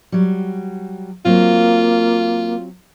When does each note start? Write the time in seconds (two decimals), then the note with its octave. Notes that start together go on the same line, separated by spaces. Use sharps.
0.12 F#3 G3
1.25 F#3 A#3 C4 F4